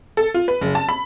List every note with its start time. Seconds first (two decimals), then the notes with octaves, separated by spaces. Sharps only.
0.17 A4
0.34 F4
0.48 B4
0.61 F#1
0.75 A5
0.89 B5